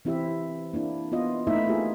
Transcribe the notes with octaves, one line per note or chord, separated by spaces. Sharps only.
E3 C4 E4 G4 E5
A#3 D4 E4
B3 F4 D#5
A3 A#3 D#4 E4 B4 E5
A#3 F4 G4 G#4